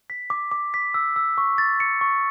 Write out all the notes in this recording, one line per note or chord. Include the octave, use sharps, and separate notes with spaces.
B6
D6
D6
B6
E6
E6
C#6
A6
C#7
C#6